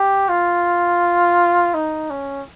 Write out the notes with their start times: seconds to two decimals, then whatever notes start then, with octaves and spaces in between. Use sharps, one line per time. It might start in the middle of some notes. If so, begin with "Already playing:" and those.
Already playing: G4
0.29 F4
1.74 D#4
2.10 C#4